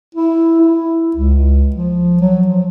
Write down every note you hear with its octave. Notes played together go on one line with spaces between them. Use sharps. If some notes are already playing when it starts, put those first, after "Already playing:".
E4
E4
C#2
F3
F#3
F3